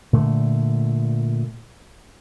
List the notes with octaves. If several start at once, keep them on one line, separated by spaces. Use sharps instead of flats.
A#2 D3 A3